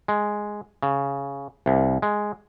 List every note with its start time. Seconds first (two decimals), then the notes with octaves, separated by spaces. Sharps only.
0.08 G#3
0.83 C#3
1.66 C2
2.02 G#3